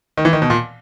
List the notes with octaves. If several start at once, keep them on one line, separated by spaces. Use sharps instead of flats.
D#3
E3
D#3
B2
A#2